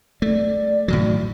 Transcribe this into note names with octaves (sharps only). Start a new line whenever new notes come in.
A3 D5
A2 D#3 F#3